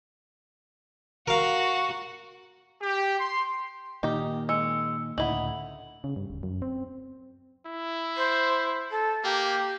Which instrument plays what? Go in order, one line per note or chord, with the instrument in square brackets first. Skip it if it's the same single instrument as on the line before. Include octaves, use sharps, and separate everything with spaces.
[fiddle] F#4 [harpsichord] A#4 F5
[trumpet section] G4
C6
[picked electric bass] A#2 D#3 A#3 [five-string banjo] D#4 G4
[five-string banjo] G#3 [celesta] E6 C#7
[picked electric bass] C#2 A2 D3 [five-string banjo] D#4 E4 [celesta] F#5 F#7
[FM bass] C#3
G2
D1
F#2
C4
[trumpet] E4
[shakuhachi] C5
A4
[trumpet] A#3 [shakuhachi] G4